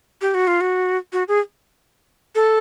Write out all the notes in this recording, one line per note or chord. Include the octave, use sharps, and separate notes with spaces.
G4
F#4
F4
F#4
F#4
G#4
A4